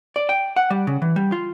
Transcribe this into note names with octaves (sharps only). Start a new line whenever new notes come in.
D5
G5
F#5
G3
C#3
E3
G3
F4